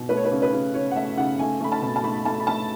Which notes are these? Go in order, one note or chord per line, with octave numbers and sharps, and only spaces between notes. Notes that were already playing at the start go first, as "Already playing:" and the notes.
Already playing: B2
A3 B4
C#5
B4
C#3
B4
C#3
C#3 C#5
F#5
A3 E5
C#3 F#5
A3 G#5
A3 B5
A5
B2
A5
A3 B5
A3 A5
B5
A3 A5